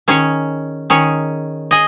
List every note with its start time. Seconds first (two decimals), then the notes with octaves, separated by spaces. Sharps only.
0.08 D#3 C#4 G#4 C#5
0.90 D#3 C#4 G#4 C#5
1.71 G#4 D#5